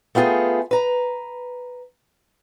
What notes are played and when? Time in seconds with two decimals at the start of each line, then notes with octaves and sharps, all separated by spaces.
0.15 A3 B3 F4 G4 G#4 G5
0.71 B4 A#5